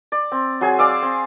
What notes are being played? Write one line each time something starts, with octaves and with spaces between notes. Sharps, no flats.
D5
C4
F#3 G#4 G#5
D5 F5 D6 E6
C4